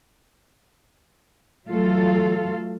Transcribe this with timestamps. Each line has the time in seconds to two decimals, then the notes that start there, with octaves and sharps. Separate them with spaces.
1.69 E3 F#3 A3 F4 A4 F5